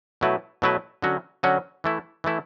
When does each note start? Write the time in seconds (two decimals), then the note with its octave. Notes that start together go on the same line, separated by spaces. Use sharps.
0.21 B2 F#3 A3 E4 B4
0.62 B2 F#3 A3 E4 B4
1.02 D3 F#3 C#4 F#4
1.43 D3 F#3 C#4 F#4
1.84 E3 A3 E4
2.24 E3 A3 E4